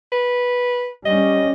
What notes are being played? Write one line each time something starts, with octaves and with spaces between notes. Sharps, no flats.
B4
G3 C#4 D#5